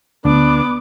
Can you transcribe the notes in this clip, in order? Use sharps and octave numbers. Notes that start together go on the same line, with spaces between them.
D2 B3 D4 D6